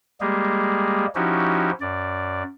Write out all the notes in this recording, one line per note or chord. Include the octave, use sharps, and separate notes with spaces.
G3 G#3 A#3 G4 G#4
F3 C#4 D#4 E4 F#4 G4
F#2 D5